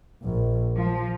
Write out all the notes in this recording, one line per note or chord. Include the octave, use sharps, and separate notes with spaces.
A#1
F3